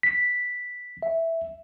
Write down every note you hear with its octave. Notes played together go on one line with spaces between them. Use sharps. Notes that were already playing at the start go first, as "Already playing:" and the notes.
B6
E5